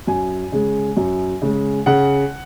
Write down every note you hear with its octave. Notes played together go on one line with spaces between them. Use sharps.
F#2 G#5
C#3 G#3
F#2
C#3 G#3
C#3 F#5